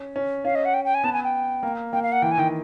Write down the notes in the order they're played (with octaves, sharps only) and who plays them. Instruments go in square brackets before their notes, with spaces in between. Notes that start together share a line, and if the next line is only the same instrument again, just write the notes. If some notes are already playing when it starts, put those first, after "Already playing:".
Already playing: [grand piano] C#4
C#4
[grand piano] C#4 [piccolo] F5
[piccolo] D#5
F#5
G5
G5
G#5
[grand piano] B3 [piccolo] A5
[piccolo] G#5
G5
[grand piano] A#3
[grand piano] A#3 [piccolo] G5
[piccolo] F5
F#5
[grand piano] E3 [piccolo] G5
[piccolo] G#5
[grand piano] D#3 [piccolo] G5